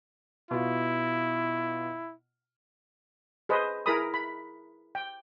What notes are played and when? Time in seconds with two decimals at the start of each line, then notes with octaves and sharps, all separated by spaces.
0.51 B2 E4 F4
3.49 G#4 B4 C5 D#5
3.86 E4 G#4 A#4 A#5 B5 D#6
4.14 B5
4.95 G5